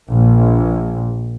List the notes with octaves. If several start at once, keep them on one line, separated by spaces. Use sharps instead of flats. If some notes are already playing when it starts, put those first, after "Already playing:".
A#1